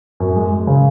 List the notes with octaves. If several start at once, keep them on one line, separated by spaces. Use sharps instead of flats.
F#2
G#3
G#3
C#3